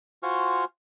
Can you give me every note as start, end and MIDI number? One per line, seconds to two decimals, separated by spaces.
0.23 0.64 65
0.23 0.64 66
0.23 0.64 72
0.23 0.64 80
0.23 0.64 85
0.23 0.64 89